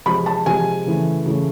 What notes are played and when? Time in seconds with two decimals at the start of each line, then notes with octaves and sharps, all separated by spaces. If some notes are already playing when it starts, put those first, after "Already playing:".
0.06 C3 F3 G#3 B5
0.26 A5
0.46 C3 F3 G#3 G#5
0.86 C#3 E3 A3
1.26 C#3 E3 A3